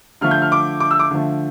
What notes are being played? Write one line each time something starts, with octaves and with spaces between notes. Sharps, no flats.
D3 F3 A3 F6
G6
F6
D6
D6
E6
D6
D3 F3 A3